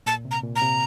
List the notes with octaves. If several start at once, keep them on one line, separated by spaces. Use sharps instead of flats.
A#2 A5
C3
A#5
A#2
A#5
C3